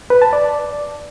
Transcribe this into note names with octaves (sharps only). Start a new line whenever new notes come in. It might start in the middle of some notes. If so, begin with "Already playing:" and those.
B4
A5
D5